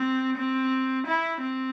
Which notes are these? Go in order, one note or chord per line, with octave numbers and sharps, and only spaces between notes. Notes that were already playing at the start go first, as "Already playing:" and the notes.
Already playing: C4
C4
E4
C4